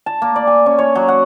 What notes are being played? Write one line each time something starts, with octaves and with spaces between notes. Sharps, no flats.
A5
A#3
D5
G#5
C#4
C#5
F#3
F#5